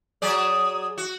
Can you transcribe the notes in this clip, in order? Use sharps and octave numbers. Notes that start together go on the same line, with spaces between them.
F#3 G#4 D5 D#6
F#4